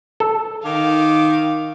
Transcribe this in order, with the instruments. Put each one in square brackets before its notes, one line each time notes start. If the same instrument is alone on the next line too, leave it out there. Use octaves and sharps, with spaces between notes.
[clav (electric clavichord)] A4
[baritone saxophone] D#3 [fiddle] F5 [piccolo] D6